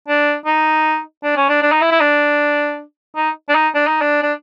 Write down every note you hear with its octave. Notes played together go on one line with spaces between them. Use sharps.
D4
D#4
D4
C#4
D4
D4
D#4
E4
E4
D4
D#4
D4
D#4
D4
D#4
D4
D4